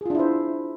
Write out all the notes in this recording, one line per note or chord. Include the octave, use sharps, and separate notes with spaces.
D4 E4 F4 G#4 C5